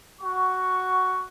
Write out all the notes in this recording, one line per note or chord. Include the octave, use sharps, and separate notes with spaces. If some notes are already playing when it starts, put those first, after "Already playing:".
F#4 C#6